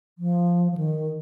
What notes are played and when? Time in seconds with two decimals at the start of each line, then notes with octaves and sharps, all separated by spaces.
0.18 F3
0.72 F3
0.77 D#3